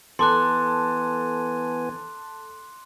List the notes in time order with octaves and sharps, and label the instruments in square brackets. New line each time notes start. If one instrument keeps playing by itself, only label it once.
[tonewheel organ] E3 B3 G#5 [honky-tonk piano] A4 [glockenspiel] C6 D6 F#6